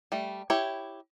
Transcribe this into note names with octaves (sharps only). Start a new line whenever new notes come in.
G3 A3
E4 G4 C#5